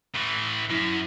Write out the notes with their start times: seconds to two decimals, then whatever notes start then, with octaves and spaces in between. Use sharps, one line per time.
0.15 A2 E3
0.70 F#2 E4